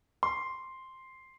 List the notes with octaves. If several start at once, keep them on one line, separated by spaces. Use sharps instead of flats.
C6